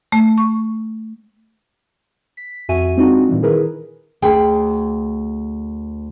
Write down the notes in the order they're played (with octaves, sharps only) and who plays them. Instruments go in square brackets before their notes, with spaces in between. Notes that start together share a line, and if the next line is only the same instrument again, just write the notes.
[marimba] A3
C#6
[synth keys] B6
F2 F#4 E5 G#5 D#7
G#3 C4 D4 D#4 F4 F#4
A#2 E3 G3
D#3 E4 G#4 A#4 B4
[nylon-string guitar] D2 G#4 G5